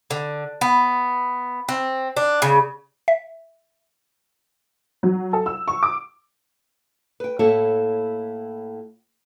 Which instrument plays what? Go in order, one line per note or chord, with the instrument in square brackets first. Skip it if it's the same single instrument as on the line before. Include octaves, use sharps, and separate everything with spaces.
[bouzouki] D3
B3
C4
D4
C#3
[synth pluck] E5
[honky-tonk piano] F#3
A4
E6
C#6
D6
[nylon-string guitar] B4 G5
A2 A#3 E4 A4 C#5 A5